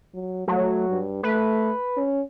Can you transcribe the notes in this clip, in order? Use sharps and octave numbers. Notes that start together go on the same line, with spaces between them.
F#3
F#3 A3
G2
A3 B4
C#4